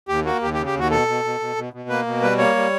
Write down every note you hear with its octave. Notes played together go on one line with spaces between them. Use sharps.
D#2 G4
A#3 F#4
D#2 G4
G4
C#3
G4
D#2 F#4
B2 A4
B2
B2
B2
B2
B2
A#3 B4
B2
G3 B4
A#3 C#5
G3